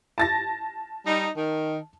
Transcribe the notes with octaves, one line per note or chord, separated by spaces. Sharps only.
A5 A6 A#6
G3 D#4
D#3